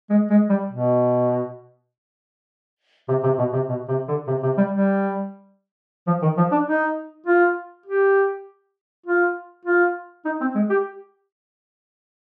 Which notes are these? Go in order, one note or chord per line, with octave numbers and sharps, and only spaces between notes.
G#3
G#3
G3
B2
C3
C3
B2
C3
B2
C3
D3
C3
C3
G3
G3
F3
D#3
F3
D4
D#4
F4
G4
F4
F4
D#4
C4
G#3
G4